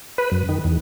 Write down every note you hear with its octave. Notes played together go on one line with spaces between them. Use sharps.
B4
F#2
D#3
E2